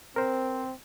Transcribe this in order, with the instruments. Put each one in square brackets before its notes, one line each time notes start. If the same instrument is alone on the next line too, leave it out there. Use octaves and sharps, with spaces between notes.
[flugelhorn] C4 [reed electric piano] A#4 C5